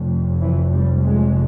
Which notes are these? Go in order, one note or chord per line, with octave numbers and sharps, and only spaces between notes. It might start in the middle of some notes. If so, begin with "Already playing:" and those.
Already playing: F1 F2
E3
G3
G#3